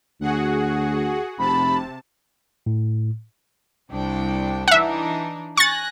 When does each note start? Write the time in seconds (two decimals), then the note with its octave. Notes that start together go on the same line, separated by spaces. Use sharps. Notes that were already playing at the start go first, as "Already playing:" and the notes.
0.21 D2 F#4 G#4 F#5
1.39 F1 C3 A5 B5
2.66 A2
3.90 C2 D4 G5
4.68 E3 D4 D#4 E5 F#5
5.57 G#5 C#6 F#6 A6 A#6